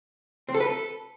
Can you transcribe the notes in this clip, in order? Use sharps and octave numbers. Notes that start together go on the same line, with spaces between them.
C4
A4
B4
A4